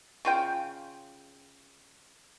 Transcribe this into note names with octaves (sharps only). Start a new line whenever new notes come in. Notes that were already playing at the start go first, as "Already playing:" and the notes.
C#3 F4 G5